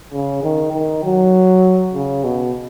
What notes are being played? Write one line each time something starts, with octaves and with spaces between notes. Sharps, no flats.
C#3
D#3
D#3
F#3
C#3
B2